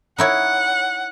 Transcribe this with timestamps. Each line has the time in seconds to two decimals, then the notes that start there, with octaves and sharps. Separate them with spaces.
0.18 D#4 E4 C#5 F#5